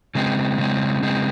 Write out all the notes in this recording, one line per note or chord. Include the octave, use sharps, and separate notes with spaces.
C#3 G#3 C4
C#3 G#3 C4
C#3 G#3 C4